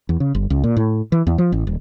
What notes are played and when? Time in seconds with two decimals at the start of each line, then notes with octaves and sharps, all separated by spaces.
0.09 E2
0.20 C#3
0.35 G1
0.50 C#2
0.64 A#2
0.77 A2
1.12 E3
1.27 E2
1.38 F3
1.52 A1
1.67 D#1